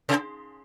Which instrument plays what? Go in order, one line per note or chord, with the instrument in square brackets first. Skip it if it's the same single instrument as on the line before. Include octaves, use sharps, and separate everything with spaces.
[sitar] C3